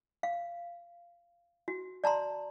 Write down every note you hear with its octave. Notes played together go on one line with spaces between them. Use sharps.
F5
F#4
D5 A5 A#5 C6